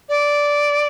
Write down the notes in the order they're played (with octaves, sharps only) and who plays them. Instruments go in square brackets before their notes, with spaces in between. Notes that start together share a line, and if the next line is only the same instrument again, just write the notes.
[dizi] D5